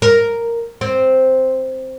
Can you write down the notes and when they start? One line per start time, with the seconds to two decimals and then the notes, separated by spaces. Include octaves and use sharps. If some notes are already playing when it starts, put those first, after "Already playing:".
0.02 A#4
0.81 C4